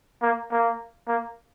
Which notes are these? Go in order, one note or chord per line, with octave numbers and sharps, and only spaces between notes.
A#3
A#3
A#3